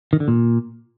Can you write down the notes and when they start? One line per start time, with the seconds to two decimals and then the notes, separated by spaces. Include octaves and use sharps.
0.13 D#3
0.20 D3
0.28 A#2